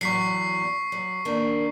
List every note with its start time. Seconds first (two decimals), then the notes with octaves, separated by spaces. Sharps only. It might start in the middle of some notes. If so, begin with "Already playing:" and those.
0.01 E2 A2 F#3 C#6 B6 C7
0.92 F#3
1.25 D#3 A#3 D4